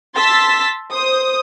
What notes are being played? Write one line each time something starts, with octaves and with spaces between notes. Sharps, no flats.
A5 C6 E6 A6 B6
C5 D#6